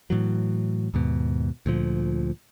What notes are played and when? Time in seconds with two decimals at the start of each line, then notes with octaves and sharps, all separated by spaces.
0.10 A2 E3 F#3
0.94 D#2 G#2 B2
1.66 D2 A#2 F3